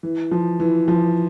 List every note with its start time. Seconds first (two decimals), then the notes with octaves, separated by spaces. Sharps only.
0.03 E3
0.31 F3
0.60 E3
0.88 F3